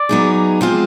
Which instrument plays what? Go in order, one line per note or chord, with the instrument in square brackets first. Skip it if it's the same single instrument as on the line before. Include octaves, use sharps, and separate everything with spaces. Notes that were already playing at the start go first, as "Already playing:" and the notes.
Already playing: [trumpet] D5
[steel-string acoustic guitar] F#3 B3 D#4 G#4
F3 G#3 C4 F4 G#4